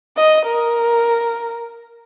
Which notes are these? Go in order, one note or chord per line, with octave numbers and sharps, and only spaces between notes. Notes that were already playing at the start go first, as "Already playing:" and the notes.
D#5
A#4